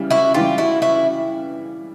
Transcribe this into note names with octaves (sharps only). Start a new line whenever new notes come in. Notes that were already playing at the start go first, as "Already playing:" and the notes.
Already playing: C#3 E3 G3
E4 F#4
C#3 E3 G3 F4 G4
E4 F#4
E4 F#4